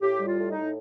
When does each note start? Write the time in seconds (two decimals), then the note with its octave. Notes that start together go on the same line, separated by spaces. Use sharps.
0.01 A2 G4
0.20 G3
0.26 F4
0.38 A2
0.50 D#4
0.56 A2